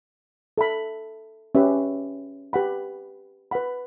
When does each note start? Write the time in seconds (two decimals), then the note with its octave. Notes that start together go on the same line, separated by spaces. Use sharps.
0.58 A4 E5 B5
1.55 C#4 G4 B4 E5
2.53 G4 B4 F#5 B5
3.51 B4 F#5 B5